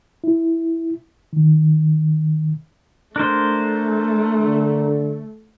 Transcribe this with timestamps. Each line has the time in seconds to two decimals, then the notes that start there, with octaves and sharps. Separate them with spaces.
0.24 E4
1.33 D#3
3.16 A3 D4 A#4 C5
4.40 D3